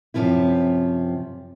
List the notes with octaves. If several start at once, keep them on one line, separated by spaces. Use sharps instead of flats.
F#2 C3 F3 C4 E4